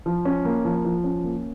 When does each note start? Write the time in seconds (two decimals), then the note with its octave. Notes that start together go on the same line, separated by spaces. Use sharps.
0.06 F3
0.25 C#4
0.45 A#3
0.65 F3
0.85 F3
1.04 C#4
1.24 A#3